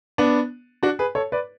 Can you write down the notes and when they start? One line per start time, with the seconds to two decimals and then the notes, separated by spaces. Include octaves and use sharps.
0.18 B3 D4
0.83 D4 F#4
0.99 G#4 B4
1.15 A4 C#5
1.32 B4 D5